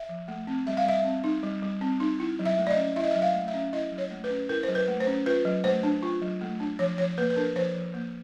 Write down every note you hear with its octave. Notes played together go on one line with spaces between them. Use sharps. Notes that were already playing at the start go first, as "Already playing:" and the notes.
Already playing: E5
F3
A3
C4
G3 E5
F5
G3 E5
C4
D#4
G3
G3
C4
D#4
E4
F#3
E5
A3
D5
D#5
C#4
E4 E5
D#5
F#3 E5
F5
A3
E5
C#4
E4 D#5
F#3
C#5
A3
B4
C#4
E4 A#4
F#3 C5
B4
A3
C5
C#4
F4 B4
F#3
A3 C5
D4
F4
F#3
A3
D4
F3 C#5
F3 C#5
A#3 B4
B4
D4 A#4
F3 C5
F3
A#3